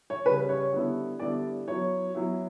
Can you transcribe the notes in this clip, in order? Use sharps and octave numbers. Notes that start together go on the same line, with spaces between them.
C#5
C#3 G3 C#4 B4
C#5
D3 G3 B3 E4
D3 G3 B3 E4 D5
F#3 B3 E4 C#5
F#3 B3 E4